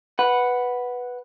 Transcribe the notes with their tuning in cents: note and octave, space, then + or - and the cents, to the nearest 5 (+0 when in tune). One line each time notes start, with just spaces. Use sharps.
B4 +0 F#5 +0